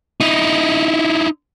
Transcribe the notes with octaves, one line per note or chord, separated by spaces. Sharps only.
D#4 E4